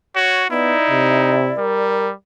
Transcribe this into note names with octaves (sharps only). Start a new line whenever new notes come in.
F#4 C#5
B3 D#4 E4 D5
C3
G3 A#4